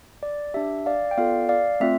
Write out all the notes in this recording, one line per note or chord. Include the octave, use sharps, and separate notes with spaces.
D5
D4 G4 E5
D5 F5
G5
B3 F4 A4 D5 F5
D5 F5
A3 C4 F4 E5